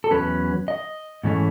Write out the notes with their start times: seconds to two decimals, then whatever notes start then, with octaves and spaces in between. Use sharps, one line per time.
0.04 A4
0.11 E2 B2 F#3 C#4 B4
0.68 D#5
1.23 G#2 E3 A3 C#4